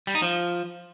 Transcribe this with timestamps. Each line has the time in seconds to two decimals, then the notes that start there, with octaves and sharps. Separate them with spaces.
0.07 G3
0.15 D#4
0.22 F3